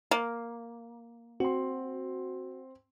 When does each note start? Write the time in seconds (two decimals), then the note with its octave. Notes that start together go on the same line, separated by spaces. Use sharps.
0.11 A#3
1.40 C4 F#4 C6